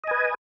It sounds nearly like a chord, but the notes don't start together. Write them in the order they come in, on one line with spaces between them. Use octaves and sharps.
D#5 G#5 B4